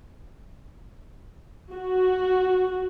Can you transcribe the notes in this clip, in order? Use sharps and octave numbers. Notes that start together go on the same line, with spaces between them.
F#4